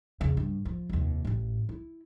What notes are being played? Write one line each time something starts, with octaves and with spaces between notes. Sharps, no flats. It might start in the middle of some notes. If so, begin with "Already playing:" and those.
E2 C#3
G2
F3
F1 D#2
A1 A2
E4